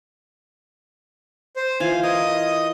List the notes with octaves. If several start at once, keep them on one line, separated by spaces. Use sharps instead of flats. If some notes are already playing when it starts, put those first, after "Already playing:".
C5
E3 F4 F5 G#5
A#4 D#5 D#6